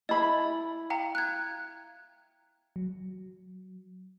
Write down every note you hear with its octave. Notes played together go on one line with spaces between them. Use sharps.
E4 D#5 B5
F5 G5 A#5
F#6 G#6
F#3